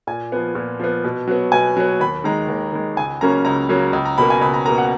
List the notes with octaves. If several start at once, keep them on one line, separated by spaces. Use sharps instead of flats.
A#2 G#5
F3 B3
A#2
F3 B3
B2
F#3 B3
B2 G#5
F#3 B3
D#2 B5
D#3 G#3 A#5
D#2
D#3 G#3
C#2 G#5
C#3 F#3 A#3 C#4 A#5
C#2 A#5
C#3 F#3 A#3 C#4
C#2
A#5
B2 A#3 B5
G#5
C#2 B5
A#5
B2 A#3 A#5
F#5